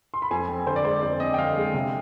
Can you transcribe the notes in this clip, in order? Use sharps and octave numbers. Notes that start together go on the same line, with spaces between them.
C6
B5
F2 G#5
C4
D3 C5
D5
G#3 C5
F2 D5
C4 D#5
G5
D3 F5
G#3
C3